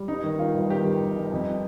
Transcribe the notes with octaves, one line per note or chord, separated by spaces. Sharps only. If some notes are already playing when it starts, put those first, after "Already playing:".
Already playing: G3
G1 D#4
D#3
D#3 F4
G1
D#3 G4
D#3
G1
G1
F2